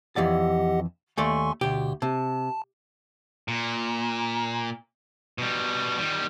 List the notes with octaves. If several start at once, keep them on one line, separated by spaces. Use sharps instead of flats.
F2 E3 G4 D5 D#5 F#5
D#2 A3 D5 G#5 C6 C#6
D2 B2 G4
C3 A5
A#2
B2 G3
D#3 G3